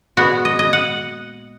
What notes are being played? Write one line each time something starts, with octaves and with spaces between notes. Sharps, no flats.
A#2 G#3 B3 F#4
D#5
D#5
F#5